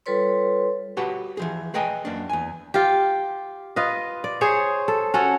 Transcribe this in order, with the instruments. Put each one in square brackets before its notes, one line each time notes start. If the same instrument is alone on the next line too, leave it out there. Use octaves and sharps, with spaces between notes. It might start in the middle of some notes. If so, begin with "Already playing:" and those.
[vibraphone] G3 F4 A4 B4 C#5 C6
[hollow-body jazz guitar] F#4 G4 B4 F#5 A5
E3 F3 G#4
G#4 B4 D#5 G5 G#5 A#5
F#2 A#3 D4
E2 G#5
[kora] F4 G4
F4 B4 D#5
D5
G#4 C5 C#5
A4
C#4 F#4 A4 C#5